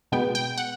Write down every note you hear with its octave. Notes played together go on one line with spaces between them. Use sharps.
B2 G#3 B3 G5
G5
F#5